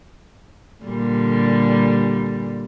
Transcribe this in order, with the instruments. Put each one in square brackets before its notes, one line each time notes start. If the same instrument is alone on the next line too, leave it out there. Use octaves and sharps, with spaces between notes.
[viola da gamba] A#2 D3 G3